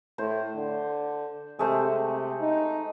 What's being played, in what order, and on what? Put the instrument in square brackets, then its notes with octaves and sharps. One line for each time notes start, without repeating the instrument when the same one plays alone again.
[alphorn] A2 [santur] C5
[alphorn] D3
[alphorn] C3 [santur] G#3 A3 C5
[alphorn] C3
D#4